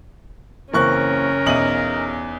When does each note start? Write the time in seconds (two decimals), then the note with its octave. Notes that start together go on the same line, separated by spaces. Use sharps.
0.73 F#1 E3 A#3 C4 C#4 A#4 C#6 F#6
1.46 B1 E2 D#4 E5 D#7 F#7